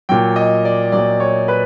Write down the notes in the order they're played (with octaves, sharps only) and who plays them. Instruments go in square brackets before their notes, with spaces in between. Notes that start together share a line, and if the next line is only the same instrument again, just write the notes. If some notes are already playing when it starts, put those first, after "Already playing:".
[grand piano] A#2 F#3 G5
D#5
D5
A#2 F#3 D5
C#5
B4